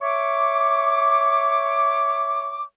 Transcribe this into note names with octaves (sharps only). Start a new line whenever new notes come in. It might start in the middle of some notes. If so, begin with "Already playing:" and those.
C#5 E5 C#6 D6